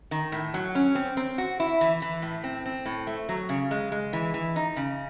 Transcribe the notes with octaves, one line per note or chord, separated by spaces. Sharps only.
D#3
A2
F#3
C#4
C4
C4
F#4
E4
E3
E3
A2
C4
C4
A2
A3
F#3
C#3
G#3
G#3
E3
E3
D#4
C#3